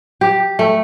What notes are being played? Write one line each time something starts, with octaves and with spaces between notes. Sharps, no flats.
G4
A3